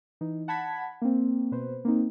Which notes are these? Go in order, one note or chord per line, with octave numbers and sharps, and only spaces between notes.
E3 D#4
F#5 A5 B5 G#6 B6
A#3 C4
B2 B4 C5
A#3 C4 D#4